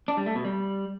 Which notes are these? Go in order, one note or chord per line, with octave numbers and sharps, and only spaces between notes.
D4
G3
A3
B2
G3